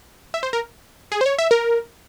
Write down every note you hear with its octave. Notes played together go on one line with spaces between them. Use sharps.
E5
C5
A#4
G#4
C5
C#5
E5
A#4